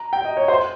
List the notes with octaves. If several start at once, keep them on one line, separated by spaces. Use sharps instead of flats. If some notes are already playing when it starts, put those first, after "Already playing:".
Already playing: A#5
G5
D#5
C#5
C5